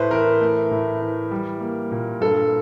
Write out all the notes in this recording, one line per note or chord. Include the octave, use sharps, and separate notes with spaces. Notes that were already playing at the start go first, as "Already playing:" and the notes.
Already playing: A2 A3 B4 C5
E3 A#4
A3
A2
E3
G3
A#3
A#2
G2 A4